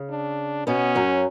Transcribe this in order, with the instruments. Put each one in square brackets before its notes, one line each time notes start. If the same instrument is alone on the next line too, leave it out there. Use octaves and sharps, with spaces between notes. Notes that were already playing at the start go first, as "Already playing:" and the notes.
Already playing: [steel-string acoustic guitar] C#3
[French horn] D4
[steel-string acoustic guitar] B2 B3 [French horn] C#4
[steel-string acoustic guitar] F#2 F#3